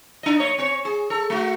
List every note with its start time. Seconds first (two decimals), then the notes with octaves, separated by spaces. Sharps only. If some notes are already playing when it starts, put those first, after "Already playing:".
0.23 D4 D#5
0.39 A#3 C#5 D#5
0.58 C4 C#5
0.85 G#4
1.10 A4
1.30 A3 F#4